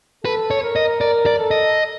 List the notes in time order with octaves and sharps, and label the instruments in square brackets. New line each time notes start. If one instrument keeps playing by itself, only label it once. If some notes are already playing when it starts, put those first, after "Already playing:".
[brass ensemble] A4 [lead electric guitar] B4
[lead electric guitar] C#5
[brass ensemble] A#4
[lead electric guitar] D#5
[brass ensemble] A#4 [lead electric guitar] D5
[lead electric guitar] D5
[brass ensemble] A4
[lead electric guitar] D#5